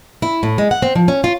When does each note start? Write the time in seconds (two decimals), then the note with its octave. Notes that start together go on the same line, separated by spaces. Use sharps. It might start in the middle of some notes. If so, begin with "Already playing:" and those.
0.22 E4
0.43 A2
0.58 G#3
0.71 F#5
0.82 C4
0.96 F3
1.08 C#4
1.24 F4